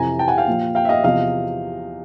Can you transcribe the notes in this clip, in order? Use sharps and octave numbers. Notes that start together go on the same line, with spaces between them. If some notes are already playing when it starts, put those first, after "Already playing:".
Already playing: F2 C3 E3 G#5 A#5
G5 A5
F#5 G#5
F5 G5
A#2 F3
F5 G5
E5
D#5 F5
E2 C3 F3 D#5 F5